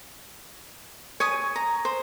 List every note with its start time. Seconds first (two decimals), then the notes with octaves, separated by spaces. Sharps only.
1.20 C#5 G#5 D#6
1.56 A#5
1.85 C5